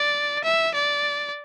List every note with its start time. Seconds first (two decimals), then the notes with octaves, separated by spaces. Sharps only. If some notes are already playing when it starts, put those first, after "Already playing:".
Already playing: D5
0.44 E5
0.74 D5